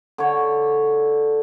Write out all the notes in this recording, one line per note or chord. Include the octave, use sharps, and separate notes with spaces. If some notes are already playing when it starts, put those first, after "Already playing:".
D3 C#5